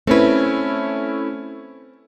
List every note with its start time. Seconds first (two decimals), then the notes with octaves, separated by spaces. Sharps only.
0.07 A3 C4 C#4 E4 B4